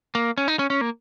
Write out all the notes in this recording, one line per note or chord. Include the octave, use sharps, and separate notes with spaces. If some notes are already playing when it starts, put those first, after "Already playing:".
A#3
C#4
D#4
C#4
C#4
A#3